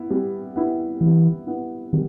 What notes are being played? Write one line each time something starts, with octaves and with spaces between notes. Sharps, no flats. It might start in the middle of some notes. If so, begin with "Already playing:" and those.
Already playing: B3 E4
G3
B3 E4
E3 G3
B3 E4
D#3 G3